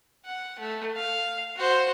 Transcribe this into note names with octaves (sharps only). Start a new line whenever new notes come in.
F#5
A3
F5
F#4 C5